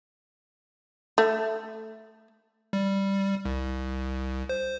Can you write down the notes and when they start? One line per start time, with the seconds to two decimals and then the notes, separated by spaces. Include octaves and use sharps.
1.18 A3
2.73 G3
3.45 C2
4.49 C5